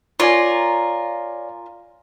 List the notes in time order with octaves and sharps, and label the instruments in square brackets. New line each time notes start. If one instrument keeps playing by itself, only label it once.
[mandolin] F4 A#4 [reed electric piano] C#5 D5 G#5